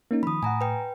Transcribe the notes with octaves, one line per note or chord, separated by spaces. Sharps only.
A#3 C#4 D#4
D#3 F3 B5 D#6
A2 F#5 G#5 A#5
B4 G5